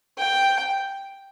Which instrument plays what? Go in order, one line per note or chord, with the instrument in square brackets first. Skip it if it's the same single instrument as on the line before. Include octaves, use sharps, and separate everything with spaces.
[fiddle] G5